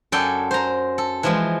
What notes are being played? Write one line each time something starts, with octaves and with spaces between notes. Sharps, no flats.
F#2 A4 D5 G5 G#5
C5 A#5
A4
E3 F3 G#3